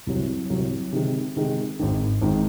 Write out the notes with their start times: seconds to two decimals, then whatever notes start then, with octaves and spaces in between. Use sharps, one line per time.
0.07 C2 C3 F#3
0.50 C2 C3 F#3
0.92 C3 D#3 G#3
1.36 C3 D#3 G#3
1.79 G#1 G#2 D#3
2.22 G#1 G#2 D#3